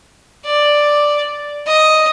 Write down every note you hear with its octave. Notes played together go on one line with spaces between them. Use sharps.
D5
D#5